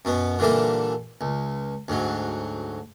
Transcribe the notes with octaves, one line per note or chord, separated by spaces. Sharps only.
F#2 B2 B3
A#2 D3 E3 G3 A#3 A4
C#2
D2 G#2 F#3